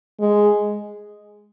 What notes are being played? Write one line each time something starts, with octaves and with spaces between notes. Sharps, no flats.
G#3